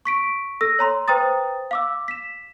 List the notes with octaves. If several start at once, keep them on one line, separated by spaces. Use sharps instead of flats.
C#6 B6 D7
A4 E6 A#6
C#5 A#5 C6
B4 C5 G5 A#5 D#6 A6
F5 D6 E6
B6 E7